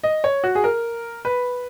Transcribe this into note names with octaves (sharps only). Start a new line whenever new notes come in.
D#5
C#5
F#4
G#4
A#4
B4